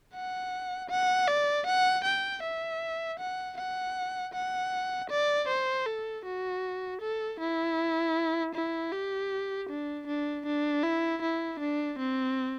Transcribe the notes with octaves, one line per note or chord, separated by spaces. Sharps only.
F#5
F#5
D5
F#5
G5
E5
F#5
F#5
F#5
D5
C5
A4
F#4
A4
E4
E4
G4
D4
D4
D4
E4
E4
D4
C4